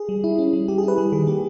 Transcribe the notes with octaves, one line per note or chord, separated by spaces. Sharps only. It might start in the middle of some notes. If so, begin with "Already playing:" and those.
Already playing: G#4
G3
E4
C#4
G3
G3 G4
G#4
E4
B4
G3 G#4
D#3 G#4
A#3 G4